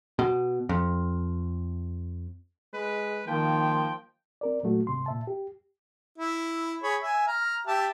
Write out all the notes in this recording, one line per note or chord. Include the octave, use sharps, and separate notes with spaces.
B2
F2
G#3 B4
D#3 F3 A#3 G5
C4 A#4 D5
A#2 F#3 A3 F#4
G#2 C3 C6
A#2 E5 A5
G4
E4
G#4 C#5 B5
E5 G#5
A#5 F6
G4 E5 A5